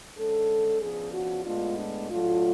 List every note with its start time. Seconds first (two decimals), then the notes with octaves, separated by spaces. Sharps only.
0.17 D3 G#3 C#4 A4
0.81 C#3 F3 B3 D4 G#4
1.14 F#4
1.46 A2 G#3 B3 D4 F4
1.78 D4
2.10 A2 F#3 A3 D4 F4